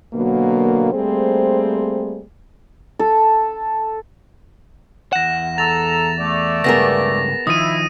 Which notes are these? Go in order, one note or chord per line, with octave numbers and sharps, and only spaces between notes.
B2 D3 F#3 A#3
G3 A3 A#3 C4 G#4 C5
A4
E2 F#5 A#6 E7
A4 A#5 A6 F7
A3 D5
C#2 G2 B3 G#4 A#4 A#6
D#3 F3 E4 D#6 D#7